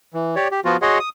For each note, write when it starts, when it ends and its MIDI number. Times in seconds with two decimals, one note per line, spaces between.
0.14 0.35 52
0.36 0.48 67
0.36 0.48 73
0.36 0.48 74
0.52 0.60 67
0.65 0.77 53
0.65 0.77 59
0.65 0.77 65
0.65 0.77 66
0.82 0.98 66
0.82 0.98 68
0.82 0.98 73
0.82 0.98 75
0.82 0.98 78
0.82 0.98 84
1.00 1.09 87